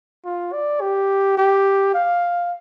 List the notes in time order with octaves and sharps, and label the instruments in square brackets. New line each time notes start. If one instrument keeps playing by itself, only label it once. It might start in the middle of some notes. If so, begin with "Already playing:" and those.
[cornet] F4
D5
G4
G4
F5